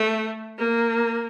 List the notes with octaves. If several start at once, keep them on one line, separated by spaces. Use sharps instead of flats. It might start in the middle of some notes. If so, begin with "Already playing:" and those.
Already playing: A3
A#3